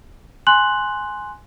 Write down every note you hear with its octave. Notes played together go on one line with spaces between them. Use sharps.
G#5 C6 F#6 F#7